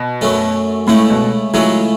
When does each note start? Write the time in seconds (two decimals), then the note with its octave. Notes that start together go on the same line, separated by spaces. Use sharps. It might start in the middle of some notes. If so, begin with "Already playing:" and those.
Already playing: B2
0.21 F#2 F#3 A3 C#4
0.87 C#2 A2 C#3 A3 E4
1.10 B2
1.54 C#2 C#3 E3 F#3 A3 C#4